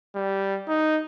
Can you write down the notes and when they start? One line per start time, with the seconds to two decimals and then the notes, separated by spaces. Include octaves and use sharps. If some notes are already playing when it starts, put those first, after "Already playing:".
0.15 G3
0.68 D#4